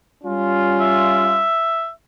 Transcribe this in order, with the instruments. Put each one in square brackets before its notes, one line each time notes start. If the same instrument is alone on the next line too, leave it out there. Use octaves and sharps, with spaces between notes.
[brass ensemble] G3 C#4 F4
[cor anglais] E5